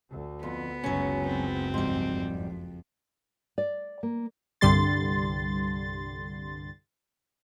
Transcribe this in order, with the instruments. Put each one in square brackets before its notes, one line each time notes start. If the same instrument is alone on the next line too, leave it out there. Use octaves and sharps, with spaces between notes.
[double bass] D2 D3
[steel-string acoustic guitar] F2 [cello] B3
[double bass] F#1 C#2 [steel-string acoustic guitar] F#3 C#4
[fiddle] C4
[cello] F2 [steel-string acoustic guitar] G#2 G3
[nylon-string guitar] D5
A#3
[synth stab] C2 G2 D3 G3 C6 A6